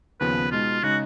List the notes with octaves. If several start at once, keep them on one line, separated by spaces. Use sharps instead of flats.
D#2 C#3 F3 B3 B4
B2 G#3 D#4 F4
C#3 G#3 D#4 F#4